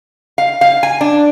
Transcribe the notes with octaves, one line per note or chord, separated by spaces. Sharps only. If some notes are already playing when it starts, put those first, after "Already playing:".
F5
F5
G#5
D4